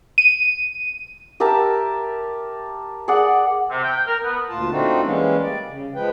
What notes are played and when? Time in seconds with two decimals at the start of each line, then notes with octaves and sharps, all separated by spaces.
0.18 D#7
1.40 G4 A#4 E5 A5
3.08 G#4 D5 F#5
3.70 C3
3.84 G5
4.06 A#4
4.23 B3
4.49 D2 A#2 F4 A5
4.70 A3 C4 D4 D#4 F4 F#4
5.02 E3 G3 G#3 A#3 C#4
5.41 G3 D5
5.66 C#3
5.95 F3 G#3 B4 G5